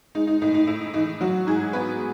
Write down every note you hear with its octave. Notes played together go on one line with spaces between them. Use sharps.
G#3 D#4
D#4
A2 D#4
D#4
A2 E4
E3 D#4
F#3 F#4
G#2 G#4
B3 B4